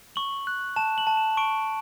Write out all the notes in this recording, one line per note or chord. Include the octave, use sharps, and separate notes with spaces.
C#6 F#7
F#6
A5 E7
F#7
A5
E7
C#6 D7